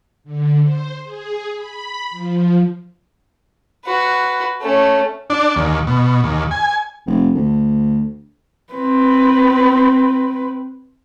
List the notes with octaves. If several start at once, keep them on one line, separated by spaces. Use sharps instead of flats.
D3
C5
G#4
B5
F3
F#4 B4
A3 C#4
D4
D#2
B2
D#2
G#5
F1
D2
C4 B4